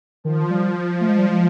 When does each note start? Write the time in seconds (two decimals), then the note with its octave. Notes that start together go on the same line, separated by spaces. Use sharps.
0.24 D#3 F3
0.50 G3
1.00 F3 A3
1.09 G#3
1.18 G3
1.26 G#3